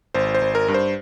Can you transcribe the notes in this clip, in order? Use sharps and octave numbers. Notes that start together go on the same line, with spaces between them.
G#1 C5
C5
G#1
A#4
G2
C5